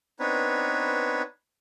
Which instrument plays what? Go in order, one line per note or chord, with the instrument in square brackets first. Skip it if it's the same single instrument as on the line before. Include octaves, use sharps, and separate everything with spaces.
[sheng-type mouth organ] B3 C4 D4 D#4 B4 C#5